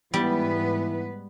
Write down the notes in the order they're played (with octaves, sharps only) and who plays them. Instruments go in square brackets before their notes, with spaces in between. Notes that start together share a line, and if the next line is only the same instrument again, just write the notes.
[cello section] G#2 B3 B4 [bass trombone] E3 [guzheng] G3